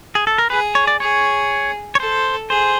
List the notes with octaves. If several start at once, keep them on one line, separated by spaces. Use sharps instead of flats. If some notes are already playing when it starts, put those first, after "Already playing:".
G#4
A4
A#4
G#4 B4
C#5
D5
G#4 C#5
C#5
A4 C5
G#4 C5